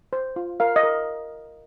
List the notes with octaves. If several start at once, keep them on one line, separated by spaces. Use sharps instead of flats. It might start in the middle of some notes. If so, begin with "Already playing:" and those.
C5
F4
A#4 F5
D#5
A#4